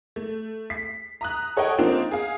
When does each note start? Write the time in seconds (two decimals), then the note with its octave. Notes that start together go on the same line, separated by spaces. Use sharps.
0.16 A3
0.70 B6 C7
1.21 A#5 D#6 F#6
1.57 A4 C#5 D#5 F#5 G5
1.78 F3 A#3 C4 D4 D#4 F4
2.11 G#4 F5